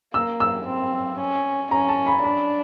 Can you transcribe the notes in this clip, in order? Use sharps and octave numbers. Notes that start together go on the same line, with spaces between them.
A#3 E6
E6
C4
C#4
C#4 A#5
A5
B5
D4 B5